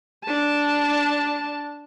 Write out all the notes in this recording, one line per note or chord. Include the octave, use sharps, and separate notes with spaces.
D4 A5